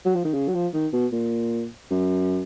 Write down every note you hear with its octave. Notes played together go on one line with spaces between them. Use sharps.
F#3
F3
D#3
C#3
F#3
F3
D#3
B2
A#2
F#2